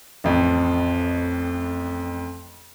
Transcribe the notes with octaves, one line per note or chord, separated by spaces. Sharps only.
A1 F2